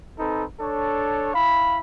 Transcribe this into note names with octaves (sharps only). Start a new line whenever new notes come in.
C4 D#4 A4 B4
D4 A4 C#5
E4 F5 B5